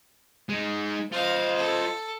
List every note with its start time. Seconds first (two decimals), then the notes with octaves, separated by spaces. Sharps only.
0.49 G#3 D#4
1.12 F4 C5 D#5 F5
1.56 A4